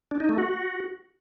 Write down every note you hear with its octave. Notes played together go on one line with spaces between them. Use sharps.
D4
D#4
A3
F#4